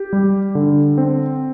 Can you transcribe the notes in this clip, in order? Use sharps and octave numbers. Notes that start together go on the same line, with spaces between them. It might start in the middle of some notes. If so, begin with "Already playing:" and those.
Already playing: G4
G3
D3
C4